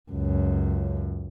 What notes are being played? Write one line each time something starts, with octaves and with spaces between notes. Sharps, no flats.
C#2 F#2